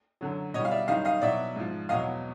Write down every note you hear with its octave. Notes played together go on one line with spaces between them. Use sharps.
F#2 D3 F#3
B2 C#5 D#5
G3
F5
D5 E5
F#2 D#3 G3 D#5 F5
D#5 F5
B2 F#3 D5 E5
G#2 F3
E2 B2 F#3 D#5 F5